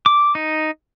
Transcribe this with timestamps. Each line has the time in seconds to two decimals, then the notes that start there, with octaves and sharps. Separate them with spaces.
0.06 D6
0.35 D#4